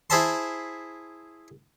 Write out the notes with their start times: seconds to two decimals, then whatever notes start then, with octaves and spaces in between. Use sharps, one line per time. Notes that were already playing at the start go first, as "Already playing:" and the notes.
0.10 E4 G#4 C5 E5 A5 C6